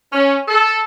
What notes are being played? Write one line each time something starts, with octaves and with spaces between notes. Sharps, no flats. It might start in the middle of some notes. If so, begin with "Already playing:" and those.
C#4
A4